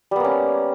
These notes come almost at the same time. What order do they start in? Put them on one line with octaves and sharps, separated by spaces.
G3 B3 A#3 C#4